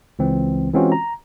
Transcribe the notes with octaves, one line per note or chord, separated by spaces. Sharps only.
C#2 E3 C4
E3 G#3 C4 C#4 F4 F#4
A#5